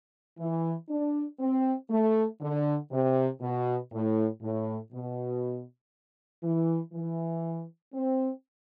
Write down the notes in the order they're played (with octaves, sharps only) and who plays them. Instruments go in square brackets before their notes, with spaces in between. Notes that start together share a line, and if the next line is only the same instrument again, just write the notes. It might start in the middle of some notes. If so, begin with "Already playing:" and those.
[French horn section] E3
D4
C4
A3
D3
C3
B2
A2
A2
B2
E3
E3
C4